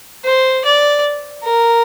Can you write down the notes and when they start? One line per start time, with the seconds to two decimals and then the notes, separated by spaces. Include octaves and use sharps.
0.25 C5
0.65 D5
1.44 A#4